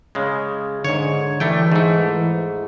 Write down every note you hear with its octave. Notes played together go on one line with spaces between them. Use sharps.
C#3 G#3
G#2 D3 C#5
E3 G3 A3 G5
G#2 A3